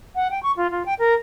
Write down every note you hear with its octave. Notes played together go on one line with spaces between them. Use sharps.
F#5
G5
C#6
F4
F4
G5
A#4